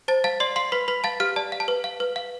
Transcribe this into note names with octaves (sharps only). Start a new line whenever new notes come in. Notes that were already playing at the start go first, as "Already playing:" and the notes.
C5 A5 A6
F5 A5 A6
D5 C6 C7
F5 C6 C7
B4 B5 B6
B4 B5 B6
F5 A5 A6
G4 F5 F6
D5 A5
F5
A5
B4
F5
B4
F5